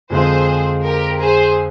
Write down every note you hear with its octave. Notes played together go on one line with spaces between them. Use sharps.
F2 D3 G#3 C4 F4 G#4 C5
G4 A#4
G#4 C5